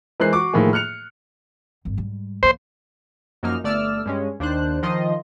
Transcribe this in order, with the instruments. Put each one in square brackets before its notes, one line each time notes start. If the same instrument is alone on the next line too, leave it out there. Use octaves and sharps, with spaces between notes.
[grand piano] E3 G#3 A#4 C5 F#6 C7
F#4 C#6 D6
A2 D#3 F3 A#3 G#4
F6 F#6 C#7 F7
[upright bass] G#1 G2
G#2 G3
[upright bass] E3 A#3 [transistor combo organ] C5
[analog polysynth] F#2 F3 A#3 D#4 F6
G1 A3 D5 E6 F6
G2 G#3 C#4
D#2 D4 C5 F#6
D#3 F3 D#5 C6